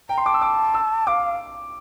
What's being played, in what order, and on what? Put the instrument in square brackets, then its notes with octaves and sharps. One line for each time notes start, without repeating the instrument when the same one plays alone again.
[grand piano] G5 [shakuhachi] A#5
[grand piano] C6
[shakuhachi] A5 [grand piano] D6
[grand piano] E6
D6
E6
[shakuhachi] F5 [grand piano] D6